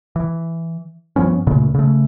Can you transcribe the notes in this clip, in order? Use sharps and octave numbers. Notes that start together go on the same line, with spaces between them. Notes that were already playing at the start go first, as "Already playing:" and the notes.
E3
G2 F3 B3 C#4
D2 A#2 C#3 A3
C#3 A3